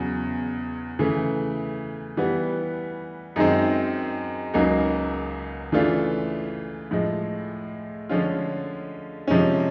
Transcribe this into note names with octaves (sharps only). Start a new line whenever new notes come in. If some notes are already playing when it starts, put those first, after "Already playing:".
Already playing: E2 C#3 F#3
C#3 E3 A3
E3 G3 B3
F#2 D#3 G#3 C4
C#2 C#3 F#3 A#3 D#4
C#3 E3 A3 D4 F4
A2 F3 G#3
D3 F3 G#3 C#4 F4
C3 F3 G#3 C#4